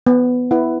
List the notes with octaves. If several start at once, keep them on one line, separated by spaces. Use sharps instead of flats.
B3
E4 B4 F#5